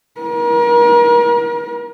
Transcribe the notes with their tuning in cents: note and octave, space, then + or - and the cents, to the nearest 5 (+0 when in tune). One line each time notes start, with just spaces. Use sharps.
A#4 +40